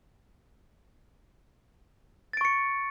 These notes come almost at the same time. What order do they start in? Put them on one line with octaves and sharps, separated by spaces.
A6 D7 C#6 C#7